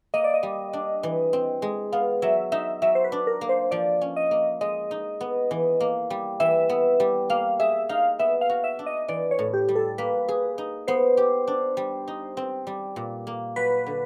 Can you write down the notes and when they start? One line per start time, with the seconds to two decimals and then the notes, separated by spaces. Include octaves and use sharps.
0.14 A#3 D#5
0.24 D5
0.34 D#5
0.43 G3
0.73 D4
1.03 E3
1.33 C4
1.62 G#3
1.92 B3 F5
2.22 F#3 E5
2.52 D#4 E5
2.82 F#3 E5
2.95 C5
3.04 B4
3.12 D4
3.27 A#4
3.41 A#3
3.49 C5
3.71 F3 D5
4.01 C#4
4.16 D#5
4.31 A#3
4.61 G#3 D#5
4.91 D#4
5.21 B3
5.51 E3
5.80 A#3
6.10 G3
6.40 E3 E5
6.70 B3
7.00 G3
7.30 A#3 F5
7.60 G#4 E5
7.89 D#4 F5
8.19 B3 E5
8.41 F5
8.49 F#4
8.64 E5
8.79 D4
8.86 D#5
9.08 E3 D5
9.31 C#5
9.39 A2
9.54 G4
9.68 G3
9.76 A4
9.98 A#3 B4
10.29 G#4
10.58 D#4
10.88 B3 C5
11.17 G4
11.47 D4
11.77 G3
12.08 D#4
12.37 C4
12.67 G3
12.96 A#2
13.27 A#3
13.56 F#3 B4
13.86 D3